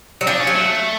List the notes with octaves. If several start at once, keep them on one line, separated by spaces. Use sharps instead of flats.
F#3
F3 D4
C#4
F#3
A3